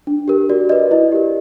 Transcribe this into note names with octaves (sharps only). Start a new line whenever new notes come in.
D4
G4 A#4
F#4 D5
B4 D5 D#5
E4 D#5
G4 A#4